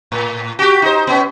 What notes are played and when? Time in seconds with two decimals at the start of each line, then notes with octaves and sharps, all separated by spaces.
0.12 A2
0.59 F#4 G4
0.82 D#4 C5
1.07 B3 C#4